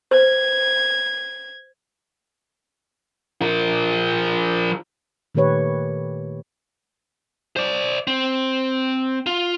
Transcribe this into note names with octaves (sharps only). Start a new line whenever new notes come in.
B4 C5 G#6
F3 A#4
A#2 D#3 A3 G4 B4 C#5
C5 D5
C4
F4